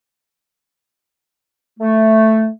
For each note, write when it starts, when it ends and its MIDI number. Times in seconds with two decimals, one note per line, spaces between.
1.80 2.49 57